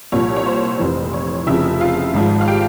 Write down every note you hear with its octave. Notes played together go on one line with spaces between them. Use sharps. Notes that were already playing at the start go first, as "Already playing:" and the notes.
C2 A#2 F3 C#5
C#5
C5
F1 F2 E3
C#5
F1 F2 C#3 F3 E4 E5
F4 F5
G#1 G#2 F3
F5
G4 G5